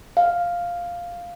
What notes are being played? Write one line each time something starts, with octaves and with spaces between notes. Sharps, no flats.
F5